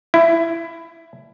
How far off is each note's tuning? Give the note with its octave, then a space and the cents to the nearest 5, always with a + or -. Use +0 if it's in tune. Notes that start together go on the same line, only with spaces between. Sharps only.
E4 +15